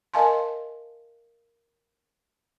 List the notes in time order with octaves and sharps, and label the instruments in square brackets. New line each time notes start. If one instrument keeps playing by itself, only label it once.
[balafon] A#4 D#5 F5 G#5 A5 C6